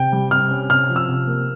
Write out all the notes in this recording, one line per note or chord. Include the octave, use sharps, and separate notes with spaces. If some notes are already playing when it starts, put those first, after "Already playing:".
Already playing: C3 G5
G3
C3 F6
C#4
C3 F6
F3
E6
C3
A#3